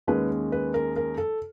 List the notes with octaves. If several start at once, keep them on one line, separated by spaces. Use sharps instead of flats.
D#2 D#3 G#3 C#4 B4
B4
A#4
A#4
A4